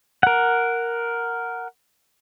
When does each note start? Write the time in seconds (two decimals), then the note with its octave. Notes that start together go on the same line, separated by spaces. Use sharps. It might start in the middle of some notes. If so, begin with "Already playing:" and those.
0.23 A#4 F#5